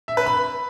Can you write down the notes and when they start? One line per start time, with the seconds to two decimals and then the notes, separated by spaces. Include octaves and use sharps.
0.08 E5
0.17 B4
0.26 B5